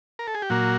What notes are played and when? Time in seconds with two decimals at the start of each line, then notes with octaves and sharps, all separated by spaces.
0.19 A#4
0.27 A4
0.35 G#4
0.42 G4
0.50 A#2 F#3 A#3 F#4